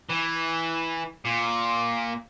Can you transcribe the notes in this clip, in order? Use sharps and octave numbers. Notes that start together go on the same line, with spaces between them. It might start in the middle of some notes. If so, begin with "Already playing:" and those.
E3
A#2